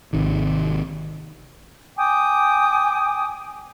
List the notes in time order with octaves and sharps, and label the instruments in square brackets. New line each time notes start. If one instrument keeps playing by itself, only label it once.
[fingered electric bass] G#1 C3 D#3
[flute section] G5 G#5 D6 D#6